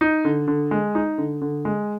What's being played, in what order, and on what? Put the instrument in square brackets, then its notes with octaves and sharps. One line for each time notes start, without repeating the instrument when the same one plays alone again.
[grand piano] D#4
D3
D3
G#3
D#4
D3
D3
G#3